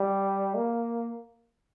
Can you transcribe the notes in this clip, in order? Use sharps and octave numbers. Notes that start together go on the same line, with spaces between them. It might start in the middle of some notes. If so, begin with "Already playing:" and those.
Already playing: G3
A#3